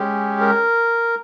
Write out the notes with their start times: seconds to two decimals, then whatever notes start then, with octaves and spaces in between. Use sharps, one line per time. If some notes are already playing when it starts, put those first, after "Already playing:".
Already playing: G#3 C#4 G4
0.41 A#4